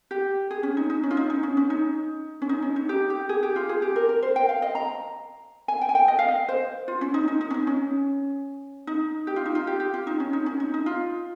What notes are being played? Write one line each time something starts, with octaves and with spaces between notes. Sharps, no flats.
G4
G#4
C#4
D#4
D#4
C#4
F4
D#4
D#4
C#4
C#4
D#4
C#4
D#4
C#4
D#4
G4
G4
G#4
G4
F4
G#4
G4
A#4
A#4
C5
G5
F5
D#5
A#5
G#5
G5
G#5
G5
D#5
F5
D#5
C5
F4
C#4
D#4
D#4
D#4
C#4
D#4
C#4
D#4
G4
F4
D#4
F4
G4
G4
F4
D#4
C#4
D#4
C#4
D#4
D#4
F4